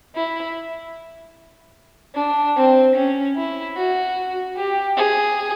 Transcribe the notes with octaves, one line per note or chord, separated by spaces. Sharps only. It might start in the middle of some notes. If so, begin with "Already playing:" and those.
E4
D4
C4
C#4
E4
F#4
G4
G#4